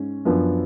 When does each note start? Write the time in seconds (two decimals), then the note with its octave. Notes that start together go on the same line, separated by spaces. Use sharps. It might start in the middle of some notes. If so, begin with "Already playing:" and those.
Already playing: G#2 C#4
0.25 F#2 F3 B3 D4